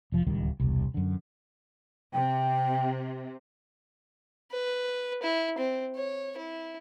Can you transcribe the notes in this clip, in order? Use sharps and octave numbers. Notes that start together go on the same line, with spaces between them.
F1 F3
D1 C#2 D#3 G3
E1 C2
F#2 D3
C3 G5
B4
E4
C4
C#5
E4